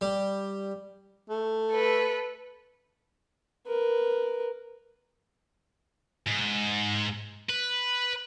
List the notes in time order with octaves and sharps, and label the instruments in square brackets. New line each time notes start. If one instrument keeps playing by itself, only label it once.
[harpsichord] G3
[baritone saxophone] A3
[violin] A4 B4
[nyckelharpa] A#4 B4
[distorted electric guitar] G#2
B4